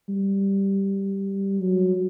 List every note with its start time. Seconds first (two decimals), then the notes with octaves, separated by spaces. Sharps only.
0.09 G3
1.61 F#3